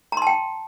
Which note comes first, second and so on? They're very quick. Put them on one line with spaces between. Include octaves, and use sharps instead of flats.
A#5 C6 A5 G5